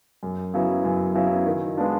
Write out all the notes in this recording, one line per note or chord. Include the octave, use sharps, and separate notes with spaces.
F#2
C#3 F#3 B3 E4
F#2
C#3 F#3 B3 E4
D#3
G#3 B3 D4 F4